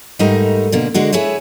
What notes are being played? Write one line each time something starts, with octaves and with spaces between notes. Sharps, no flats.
G#2 G3 A3 D#4 A#4 D#5
B2 D3 A#3
D3 G#3 D4 F#4
E4 G#4 B4 C#5 E5